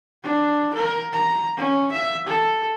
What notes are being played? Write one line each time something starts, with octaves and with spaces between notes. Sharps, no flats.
D4
A#4
A#5
C#4
E5
A4